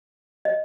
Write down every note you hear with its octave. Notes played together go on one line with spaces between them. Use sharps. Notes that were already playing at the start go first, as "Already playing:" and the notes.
D#5